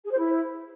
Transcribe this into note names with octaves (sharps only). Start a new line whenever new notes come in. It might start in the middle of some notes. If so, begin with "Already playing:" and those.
G#4
C5
E4